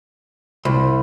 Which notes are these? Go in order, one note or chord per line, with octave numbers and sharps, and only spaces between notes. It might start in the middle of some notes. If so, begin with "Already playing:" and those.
C2